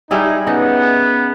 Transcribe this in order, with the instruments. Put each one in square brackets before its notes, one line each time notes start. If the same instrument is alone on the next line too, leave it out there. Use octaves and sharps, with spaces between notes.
[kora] G3 E4 G#4 [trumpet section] D#4
[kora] C#3 D#4 [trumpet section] B3